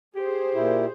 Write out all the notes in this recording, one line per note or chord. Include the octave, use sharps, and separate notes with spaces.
G4 G#4 C5
A#2 E4